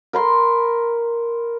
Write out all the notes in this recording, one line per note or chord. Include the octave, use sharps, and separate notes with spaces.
A#4 B5 C6